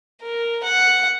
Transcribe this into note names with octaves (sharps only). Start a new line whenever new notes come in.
A#4
F#5